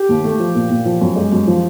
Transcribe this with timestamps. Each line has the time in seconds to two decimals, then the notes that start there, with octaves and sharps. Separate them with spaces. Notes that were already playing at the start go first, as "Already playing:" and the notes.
Already playing: G4
0.09 D#2
0.24 A3
0.40 F3
0.55 A#2
0.70 A#2
0.85 F3
1.01 F#2
1.16 G#3
1.32 F#2
1.47 F3